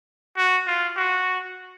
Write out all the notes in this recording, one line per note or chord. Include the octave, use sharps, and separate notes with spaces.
F#4
F4
F#4